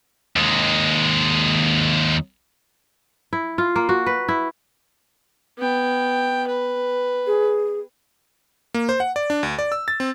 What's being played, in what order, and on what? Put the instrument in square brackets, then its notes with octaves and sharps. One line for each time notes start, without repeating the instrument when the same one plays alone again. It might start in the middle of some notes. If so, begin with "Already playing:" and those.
[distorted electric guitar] D#2 G#3
[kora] E4
F4
A#3
F#4
B4
E4
[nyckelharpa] B3 G5
B4
[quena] G#4
[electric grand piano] A#3
C5
F#5
D5
D4
D2
D5
E6
A6
C4